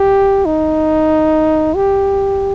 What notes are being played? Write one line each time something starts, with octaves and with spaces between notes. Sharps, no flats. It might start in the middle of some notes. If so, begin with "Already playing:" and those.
Already playing: G4
D#4
G4